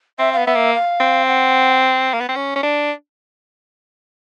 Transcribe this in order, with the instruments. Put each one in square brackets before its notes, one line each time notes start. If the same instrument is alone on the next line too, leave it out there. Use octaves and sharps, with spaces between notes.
[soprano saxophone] C4 [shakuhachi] E5
[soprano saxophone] B3 [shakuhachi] F5
[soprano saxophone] B3 [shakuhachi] E5
[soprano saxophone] A#3
[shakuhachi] F5
[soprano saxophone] C4
[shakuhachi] F#5
[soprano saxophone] A#3
B3
C4
C#4
C#4
D4